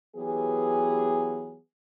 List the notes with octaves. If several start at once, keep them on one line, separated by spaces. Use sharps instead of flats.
E3 F#3 B3 G4 G#4